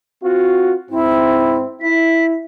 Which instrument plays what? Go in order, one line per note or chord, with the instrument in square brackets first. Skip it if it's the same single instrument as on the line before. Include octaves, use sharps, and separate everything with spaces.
[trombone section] C4 F4 F#4
[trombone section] G#2 C4 [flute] E4
[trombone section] E4 [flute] B6